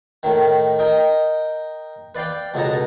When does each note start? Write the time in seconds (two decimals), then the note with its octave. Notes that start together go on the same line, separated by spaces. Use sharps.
0.23 A2 D#3
0.79 A#4 D#5 G5
2.15 B4 D5 F5 G5
2.54 C#2 B2 B3 A4 A#5